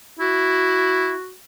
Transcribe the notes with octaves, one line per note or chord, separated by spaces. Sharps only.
E4 F#4